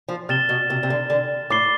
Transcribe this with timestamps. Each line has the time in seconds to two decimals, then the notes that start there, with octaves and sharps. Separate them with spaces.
0.08 F3
0.29 C3 F6 A6 E7 G7
0.49 B2
0.70 C3
0.83 C3
0.90 D3
1.10 D3
1.50 A2 D6 A6 C7 G7